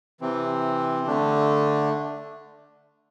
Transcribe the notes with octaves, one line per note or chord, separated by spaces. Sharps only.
C3 E3 C4
D3 A3 D4